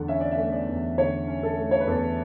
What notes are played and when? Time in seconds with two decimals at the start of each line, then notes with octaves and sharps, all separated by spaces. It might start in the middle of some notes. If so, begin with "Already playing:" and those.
Already playing: E2 D3 A3 F#5
0.08 C#4 E5
0.20 D5
0.31 E5
0.37 A3
0.52 D5
0.68 E2
0.98 D3 C#5
1.28 C#4
1.43 A4
1.58 A3
1.71 C#5
1.80 B4
1.87 E2 A4